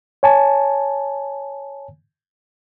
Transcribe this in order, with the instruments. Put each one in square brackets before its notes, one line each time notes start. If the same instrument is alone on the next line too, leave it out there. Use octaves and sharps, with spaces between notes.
[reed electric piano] C#5 G#5 A5